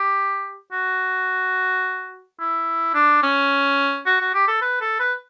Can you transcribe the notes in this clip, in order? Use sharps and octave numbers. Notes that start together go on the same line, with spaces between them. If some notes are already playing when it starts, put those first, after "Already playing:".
Already playing: G4
F#4
E4
D4
C#4
F#4
F#4
G4
A4
B4
A4
B4